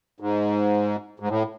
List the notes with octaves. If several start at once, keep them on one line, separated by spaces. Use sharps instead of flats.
G#2
G#2
A2